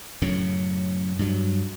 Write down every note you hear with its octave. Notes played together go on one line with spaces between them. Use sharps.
F#2 A2 C#3
G2 F#3